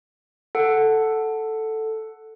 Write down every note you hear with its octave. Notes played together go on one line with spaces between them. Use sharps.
A4 F#5